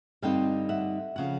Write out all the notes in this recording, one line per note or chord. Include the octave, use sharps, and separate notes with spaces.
G2 D3 G3 C4 D#4 F5 G5
E5 F#5
C#3 F3 F#5